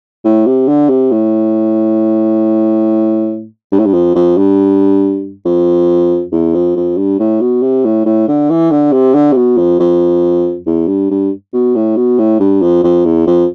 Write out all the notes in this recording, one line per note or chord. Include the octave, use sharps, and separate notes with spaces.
A2
C3
D3
C3
A2
G2
A2
G2
F2
F2
G2
F2
E2
F2
F2
G2
A2
B2
C3
A2
A2
D3
E3
D3
C3
D3
C3
B2
F2
F2
E2
G2
G2
B2
A2
B2
A2
G2
F2
F2
E2
F2